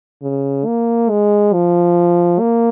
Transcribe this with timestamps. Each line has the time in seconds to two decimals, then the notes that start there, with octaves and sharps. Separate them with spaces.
0.22 C#3
0.66 A#3
1.10 G#3
1.53 F3
2.40 A#3